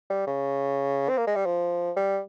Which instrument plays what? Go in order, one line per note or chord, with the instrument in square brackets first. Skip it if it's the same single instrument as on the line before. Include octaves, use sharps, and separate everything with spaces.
[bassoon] G3
C#3
C4
A#3
G#3
G3
F3
G3